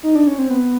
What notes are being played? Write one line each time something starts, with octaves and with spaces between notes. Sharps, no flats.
D#4
D4
C#4
C4
B3